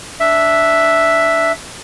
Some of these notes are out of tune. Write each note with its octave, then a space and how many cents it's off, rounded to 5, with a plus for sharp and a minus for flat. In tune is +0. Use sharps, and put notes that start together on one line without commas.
D4 +0 E5 +0